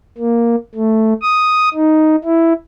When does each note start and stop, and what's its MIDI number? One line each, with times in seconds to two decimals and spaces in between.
0.18 0.55 58
0.75 1.14 57
1.22 1.69 87
1.74 2.16 63
2.24 2.53 64